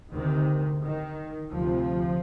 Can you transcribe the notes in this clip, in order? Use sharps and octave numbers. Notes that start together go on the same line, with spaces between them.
D2 C3 D#3
D#3
D2 C3 F3